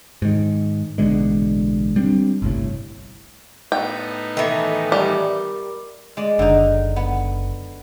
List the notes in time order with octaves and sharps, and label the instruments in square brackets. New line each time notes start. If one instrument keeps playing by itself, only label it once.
[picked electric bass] G#2 D#3
A1 B2 D3 G#3
G3 C4 D4
G1 C2 A2
[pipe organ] A2 B3 D#4 [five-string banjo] G5
[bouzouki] D#3 E3 [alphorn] A4
[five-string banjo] G3 [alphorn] A#4
[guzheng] G#3 D5
[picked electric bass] F#1 [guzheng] D3 D#4
[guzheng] B3